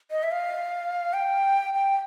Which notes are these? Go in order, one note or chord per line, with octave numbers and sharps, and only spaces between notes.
D#5
E5
F5
G5
G5